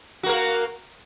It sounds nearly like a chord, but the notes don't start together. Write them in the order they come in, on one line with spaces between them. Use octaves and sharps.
F#4 A#3 A#4